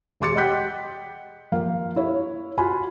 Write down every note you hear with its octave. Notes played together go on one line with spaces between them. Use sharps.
E1 G#3 C6 D6 A6 C#7
D#5 F#5 G5 F#6 G6 B6
F3 A#3 F5
E4 C#5
F4 F#4 G#5 B5